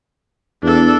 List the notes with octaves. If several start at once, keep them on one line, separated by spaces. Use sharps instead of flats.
E2 D4 A4